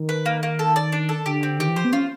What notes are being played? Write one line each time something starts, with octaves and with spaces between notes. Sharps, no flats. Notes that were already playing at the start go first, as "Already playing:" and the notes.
Already playing: D#3
B4
A#3
A#3
A4
D5
D4
A4
D3 G4
C4
D#3 G4
E3
F3 C5
B3
C#4 F4